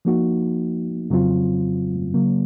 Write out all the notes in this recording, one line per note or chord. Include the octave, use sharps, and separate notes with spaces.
F3 A#3 D#4 F#4
F2 C#3 F#3 C4 F4
C#3 F#3 A#3